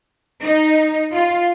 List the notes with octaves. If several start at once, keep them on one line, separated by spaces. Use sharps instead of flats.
D#4
F4